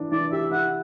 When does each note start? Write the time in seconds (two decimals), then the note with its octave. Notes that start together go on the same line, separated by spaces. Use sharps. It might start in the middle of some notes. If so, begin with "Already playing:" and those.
Already playing: E3 D4
0.12 E3 D5
0.32 G4 E5
0.51 E4 F#5